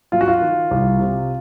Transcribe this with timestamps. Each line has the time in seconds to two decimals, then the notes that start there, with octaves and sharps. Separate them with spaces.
0.12 F#3 F4
0.21 F#4
0.28 F4
0.42 D#3
0.71 C2
0.99 C3